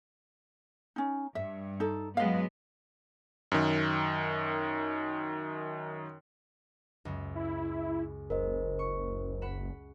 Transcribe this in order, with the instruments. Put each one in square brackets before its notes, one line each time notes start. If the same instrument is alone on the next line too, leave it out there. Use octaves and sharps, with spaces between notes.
[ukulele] C#4 D#4
[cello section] G2 [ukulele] E5
[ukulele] D#4 A4
[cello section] F#3 G#3 B3 [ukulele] D#5 F5
[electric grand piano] F#2 D#3
[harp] C#2 F#2 C#3
[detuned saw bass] E4
[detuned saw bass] F#1 [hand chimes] A#4 C5 D#5
[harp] C#6
F#5 B5 E7